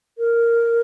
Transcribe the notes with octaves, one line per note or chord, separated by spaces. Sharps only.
A#4